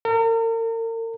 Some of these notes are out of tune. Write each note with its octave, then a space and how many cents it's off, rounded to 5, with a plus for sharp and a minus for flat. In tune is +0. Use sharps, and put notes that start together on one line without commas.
A#4 -40